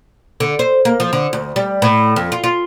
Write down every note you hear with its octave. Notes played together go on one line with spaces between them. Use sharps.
D3
C5
A#3
F3
D3
D2
G3
A2
F2
F4
F4